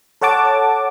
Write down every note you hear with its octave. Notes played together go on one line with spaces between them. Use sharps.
A4 C#5 F#5 A5 D6